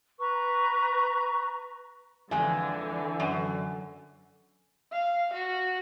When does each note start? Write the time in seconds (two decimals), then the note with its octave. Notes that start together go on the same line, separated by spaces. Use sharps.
0.20 B4 A#5 C#6
2.31 F2 D3 E3 G#3 G#5
3.20 F#2
4.93 F5
5.34 F#4